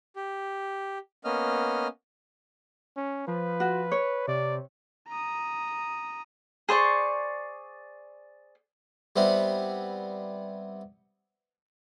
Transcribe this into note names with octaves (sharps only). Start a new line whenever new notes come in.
G4
A#3 B3 C#4 D#5 F6
C#4
F3 B4
F#4
C#5
C3 D5
A#5 D#6
G#4 C5 D5 C#6
G3 B3 C4 E4